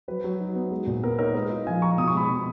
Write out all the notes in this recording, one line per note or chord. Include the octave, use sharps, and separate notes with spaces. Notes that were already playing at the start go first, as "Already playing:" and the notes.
F#3 B4
F#3
D#4
B3
G#3
A#2
B3 A#4
D#4 A#4 C#5
G#3 B4 D#5
F4
F3 F5 G#5
F4 A#5 C#6
B2 D#6
C#6
G#3 B5 D#6
B2